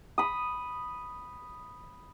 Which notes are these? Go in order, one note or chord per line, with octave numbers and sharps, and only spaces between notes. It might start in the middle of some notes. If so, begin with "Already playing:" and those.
B5 D#6